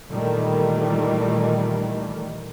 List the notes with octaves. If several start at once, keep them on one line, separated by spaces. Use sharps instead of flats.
A#2 D#3 E3 G3 A3